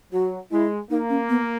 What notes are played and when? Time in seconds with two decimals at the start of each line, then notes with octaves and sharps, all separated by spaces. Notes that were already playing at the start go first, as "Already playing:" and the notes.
0.12 F#3 F#4
0.51 G#3 E4
0.90 A#3 D#4
1.10 C#4
1.29 B3